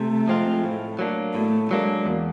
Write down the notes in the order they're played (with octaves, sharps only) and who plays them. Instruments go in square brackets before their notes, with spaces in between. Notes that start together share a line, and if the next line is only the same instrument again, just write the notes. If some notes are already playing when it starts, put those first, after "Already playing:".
Already playing: [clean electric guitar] C3 [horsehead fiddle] A3
[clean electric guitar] F3 G#3 C4 F4
A2
F#3 A#3 D4
[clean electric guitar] A2 [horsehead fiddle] A3
[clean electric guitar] F#3 A#3 D4 [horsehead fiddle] G#3
[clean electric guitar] E2